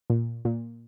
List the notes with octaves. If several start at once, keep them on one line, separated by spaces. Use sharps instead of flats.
A#2
A#2